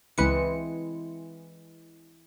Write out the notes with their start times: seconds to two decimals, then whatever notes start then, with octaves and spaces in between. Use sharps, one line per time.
0.18 C#2 E3 G#3 C4 B4 C#7